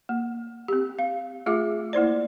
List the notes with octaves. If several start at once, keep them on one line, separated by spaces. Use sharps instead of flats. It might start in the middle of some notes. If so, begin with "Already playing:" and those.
A#3
C4 G4
F5
A3 F4 G#4 E5 D6
A#3 E4 C5 D5